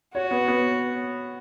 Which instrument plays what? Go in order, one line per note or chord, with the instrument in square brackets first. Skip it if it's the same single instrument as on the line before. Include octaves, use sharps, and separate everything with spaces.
[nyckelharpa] F#4 [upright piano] C#5
[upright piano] B3
B3